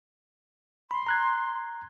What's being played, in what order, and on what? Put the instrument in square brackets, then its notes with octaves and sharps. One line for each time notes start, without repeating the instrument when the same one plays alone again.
[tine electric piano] B5 [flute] C6
[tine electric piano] A#5 F#6 G#6